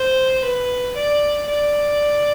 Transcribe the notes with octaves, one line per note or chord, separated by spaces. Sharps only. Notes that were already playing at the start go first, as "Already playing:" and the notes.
Already playing: C5
B4
D5
D5